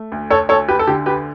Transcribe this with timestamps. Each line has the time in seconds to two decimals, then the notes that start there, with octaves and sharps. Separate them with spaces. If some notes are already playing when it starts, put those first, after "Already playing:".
Already playing: A3
0.12 D2
0.30 A4 C#5
0.49 D2 A4 C#5
0.69 G4 B4
0.79 A4
0.87 D3 G4
1.06 G4 B4